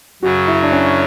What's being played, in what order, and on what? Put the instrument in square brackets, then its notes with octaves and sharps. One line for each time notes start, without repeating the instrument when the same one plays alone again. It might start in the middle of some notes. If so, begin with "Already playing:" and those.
[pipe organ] F#2 C#3 F#3 [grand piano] F#4
[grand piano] E4
D4
C#4